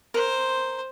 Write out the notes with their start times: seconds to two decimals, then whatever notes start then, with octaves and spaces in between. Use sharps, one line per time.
0.14 A#4 C5